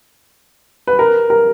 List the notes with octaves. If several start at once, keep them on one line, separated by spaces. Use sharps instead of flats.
B4
A#4
A#4